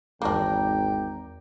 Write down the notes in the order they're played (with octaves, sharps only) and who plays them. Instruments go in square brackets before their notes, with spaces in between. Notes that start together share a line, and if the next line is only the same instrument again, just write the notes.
[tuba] G#1 [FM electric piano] E2 A#5 D6 [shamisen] A#3 D4 [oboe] G5